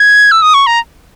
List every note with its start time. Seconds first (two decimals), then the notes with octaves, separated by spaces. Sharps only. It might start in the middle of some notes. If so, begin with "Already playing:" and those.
Already playing: G#6
0.32 E6
0.42 D#6
0.54 C#6
0.67 A#5